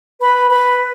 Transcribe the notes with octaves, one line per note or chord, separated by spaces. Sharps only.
B4 B5
B4 B5